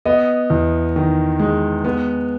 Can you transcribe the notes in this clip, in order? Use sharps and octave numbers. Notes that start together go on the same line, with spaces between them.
B3 D#5
E2
D#3
G#3
B3